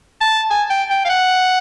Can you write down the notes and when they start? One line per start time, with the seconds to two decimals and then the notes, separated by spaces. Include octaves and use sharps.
0.21 A5
0.50 G#5
0.70 G5
0.90 G5
1.05 F5
1.09 F#5